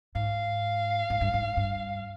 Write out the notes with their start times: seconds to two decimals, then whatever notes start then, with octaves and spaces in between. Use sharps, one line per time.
0.15 G#2 F5
1.10 G#2
1.21 G2
1.34 G#2
1.57 G2